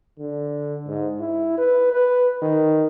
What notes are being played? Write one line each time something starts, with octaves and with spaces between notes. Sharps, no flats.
D3
G#2
E4
B4
B4
D#3